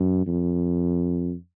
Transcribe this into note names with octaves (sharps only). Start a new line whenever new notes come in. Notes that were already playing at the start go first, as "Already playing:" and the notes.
Already playing: F#2
F2